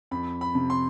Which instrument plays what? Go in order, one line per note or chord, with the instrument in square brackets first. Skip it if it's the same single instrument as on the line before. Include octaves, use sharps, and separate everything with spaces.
[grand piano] F2 B5
B5
C3
C6